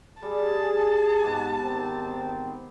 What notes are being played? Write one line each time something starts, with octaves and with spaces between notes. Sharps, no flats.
G3 G#4 A5
G#2 B3 F#4 G4
G#1 D#3 C4